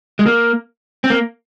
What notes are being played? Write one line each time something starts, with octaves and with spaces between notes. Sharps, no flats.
G#3
A#3
C4
A#3